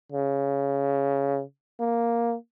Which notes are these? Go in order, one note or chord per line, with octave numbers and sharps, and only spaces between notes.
C#3
A#3